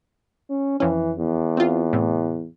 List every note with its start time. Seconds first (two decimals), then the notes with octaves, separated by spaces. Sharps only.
0.50 C#4
0.80 F2 E3 C#4
1.18 E2
1.57 C4 F4
1.93 A2 C3